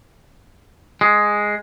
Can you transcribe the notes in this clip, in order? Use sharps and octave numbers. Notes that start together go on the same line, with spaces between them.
G#3